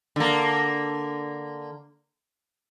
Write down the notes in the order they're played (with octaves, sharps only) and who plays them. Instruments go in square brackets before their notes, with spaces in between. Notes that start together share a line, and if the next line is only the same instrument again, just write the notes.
[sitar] D3 A#3